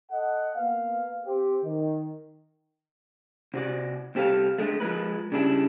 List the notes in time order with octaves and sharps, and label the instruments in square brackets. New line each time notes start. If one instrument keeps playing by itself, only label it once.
[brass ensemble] A4 D#5 F#5
A#3 B3 F5
C4 G4
D#3
[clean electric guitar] C3 F#4 D5
C2 C4 G4 A4 F5
D3 G#3 A3
F3 G#3 C#4 A#4 B4
C#3 G3 D4 E4